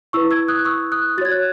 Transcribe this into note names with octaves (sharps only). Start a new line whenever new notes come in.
E4 B4 C#6 E6
E6 G#6
D#6 F#6
C#6 E6
D#6 F#6
F#4 C#5 G#6 A6
F#6